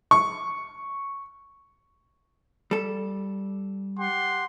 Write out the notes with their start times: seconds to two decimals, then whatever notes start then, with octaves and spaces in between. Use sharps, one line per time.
0.11 C#6
2.71 G3 A4
3.98 G4 F#5 C6